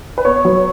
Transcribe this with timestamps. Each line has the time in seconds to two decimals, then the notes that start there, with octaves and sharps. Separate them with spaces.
0.18 B4
0.25 B3 C#5
0.45 F#3